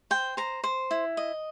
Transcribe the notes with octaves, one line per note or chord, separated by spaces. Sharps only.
C5 G5
C5 A#5
C5
E4
D#5